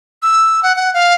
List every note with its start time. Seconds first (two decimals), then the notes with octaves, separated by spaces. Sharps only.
0.23 E6
0.63 F#5
0.76 F#5
0.94 F5